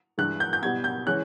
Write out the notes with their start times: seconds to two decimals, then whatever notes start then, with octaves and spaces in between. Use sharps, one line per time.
0.18 G2 E3 G#3 F#6
0.40 G6
0.53 G6
0.62 B2 G3 B3 G#6
0.84 G6
1.07 E3 G#3 C#4 F#6